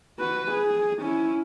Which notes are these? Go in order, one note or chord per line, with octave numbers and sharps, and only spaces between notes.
F#4 B4
G#4
C#4 E4